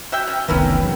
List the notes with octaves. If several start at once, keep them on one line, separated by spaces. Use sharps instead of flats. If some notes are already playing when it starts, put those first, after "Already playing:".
F#4 E5 G5
C#4
F1 C2 D#3 B3 C#4 E4 A#4 G5
E2 E3 F#3 C4